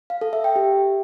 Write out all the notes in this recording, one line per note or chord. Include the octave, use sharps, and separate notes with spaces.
F5
A4
E5
G5
G4